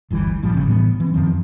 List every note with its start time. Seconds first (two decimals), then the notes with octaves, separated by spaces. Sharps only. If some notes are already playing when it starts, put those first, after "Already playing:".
0.10 G1 D2 E3 G3
0.42 A#1 G2 F3 G3
0.54 G1 A2 C#3
0.67 A2 E3 G3 B3
1.00 E3 C4
1.14 F#2 D#3 F3 C4